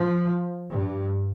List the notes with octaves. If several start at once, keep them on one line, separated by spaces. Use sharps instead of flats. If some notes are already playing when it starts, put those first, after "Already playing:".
Already playing: F3
G2